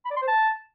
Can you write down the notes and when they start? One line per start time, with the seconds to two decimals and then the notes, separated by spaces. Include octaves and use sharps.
0.05 B5
0.11 D5
0.16 C6
0.22 C5
0.28 A5